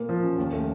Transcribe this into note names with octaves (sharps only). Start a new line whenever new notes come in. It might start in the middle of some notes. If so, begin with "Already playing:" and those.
Already playing: A#2 A#3
F3
C#4
D#2
A3